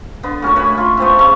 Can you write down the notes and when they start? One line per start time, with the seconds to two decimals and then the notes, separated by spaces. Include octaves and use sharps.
0.23 D3 B3
0.42 A2 C#4 F#4 A#4
0.56 F#4 B4 G#5 B5
0.78 F4
0.97 A3 B3 C4 E4
1.19 C#3 A3 C#4